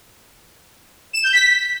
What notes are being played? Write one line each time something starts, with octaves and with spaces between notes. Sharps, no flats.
E7
G6
B6